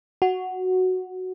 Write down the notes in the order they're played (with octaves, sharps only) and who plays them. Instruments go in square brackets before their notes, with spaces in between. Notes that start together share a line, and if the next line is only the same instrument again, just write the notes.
[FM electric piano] F#4